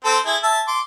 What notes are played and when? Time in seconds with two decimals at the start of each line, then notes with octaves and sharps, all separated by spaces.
0.05 C4 A4 C5
0.26 E4 G#4
0.43 E5 A5
0.68 C6 D6